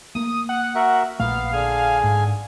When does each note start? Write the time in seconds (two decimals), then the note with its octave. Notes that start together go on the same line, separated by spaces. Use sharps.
0.15 A3 A#3 D#6
0.49 F#5
0.75 F#4 A#4 E5
1.20 A#1 A#2 A3 B3 F5
1.53 D3 G#4 G#5
2.04 G#2